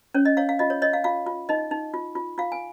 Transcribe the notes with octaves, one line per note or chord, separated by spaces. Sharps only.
C#4 C#5
D#5
C#5 F5
F5
F4 D#5
C#5
C#5 D#5
F5
F4 F5
F4
D#4 D#5
D#4
F4
F4
F4 F5
G#5